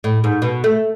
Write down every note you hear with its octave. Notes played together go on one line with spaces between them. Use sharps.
A2
G#2
B2
A3